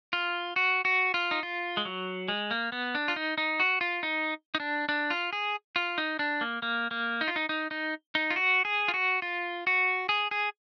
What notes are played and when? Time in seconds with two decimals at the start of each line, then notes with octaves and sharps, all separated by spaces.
0.13 F4
0.56 F#4
0.85 F#4
1.14 F4
1.31 D#4
1.43 F4
1.77 G#3
1.85 F#3
2.28 G#3
2.51 A#3
2.72 B3
2.95 D4
3.08 F4
3.16 D#4
3.38 D#4
3.60 F#4
3.81 F4
4.03 D#4
4.55 D#4
4.60 D4
4.89 D4
5.10 F4
5.33 G#4
5.76 F4
5.98 D#4
6.19 D4
6.41 A#3
6.62 A#3
6.91 A#3
7.21 D#4
7.28 F4
7.36 D#4
7.49 D#4
7.71 D#4
8.15 D#4
8.30 F4
8.36 F#4
8.65 G#4
8.88 F4
8.94 F#4
9.22 F4
9.67 F#4
10.09 G#4
10.31 G#4